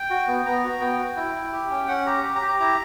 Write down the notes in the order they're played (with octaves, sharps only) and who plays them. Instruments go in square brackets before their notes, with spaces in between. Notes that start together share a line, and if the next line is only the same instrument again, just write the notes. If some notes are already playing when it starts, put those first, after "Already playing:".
Already playing: [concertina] G5
F#4
B3
B3 A#5
F#4
B3 G5
F#4
E4
E4
G4
C#4
C#4 F#5
G4 A#5
G4
A#5
G4
A#5
E4 A#5